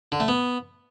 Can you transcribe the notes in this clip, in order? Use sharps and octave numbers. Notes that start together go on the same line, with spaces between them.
D3
A3
B3